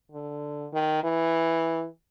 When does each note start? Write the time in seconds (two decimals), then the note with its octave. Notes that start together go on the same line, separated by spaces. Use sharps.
0.12 D3
0.73 D#3
1.03 E3